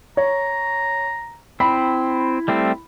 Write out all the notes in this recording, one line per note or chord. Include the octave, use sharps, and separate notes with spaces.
C#5 A#5
C4 E4 B5
G3 A3 C4